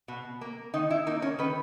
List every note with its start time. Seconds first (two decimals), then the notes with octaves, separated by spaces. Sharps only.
0.08 B2
0.41 A#3
0.74 D#3 D#4
0.91 E4
1.07 A#3 D#4
1.22 C#4
1.39 D#3 B4